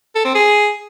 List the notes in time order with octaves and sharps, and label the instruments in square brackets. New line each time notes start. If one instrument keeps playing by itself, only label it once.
[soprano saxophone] A4
C4
G#4